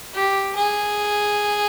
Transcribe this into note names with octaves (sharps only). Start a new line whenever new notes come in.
G4
G#4